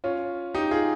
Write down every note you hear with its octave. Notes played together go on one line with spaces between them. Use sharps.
C#4 F4
D#4 G4
F4 G#4